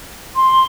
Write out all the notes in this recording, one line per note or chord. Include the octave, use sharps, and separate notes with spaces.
C6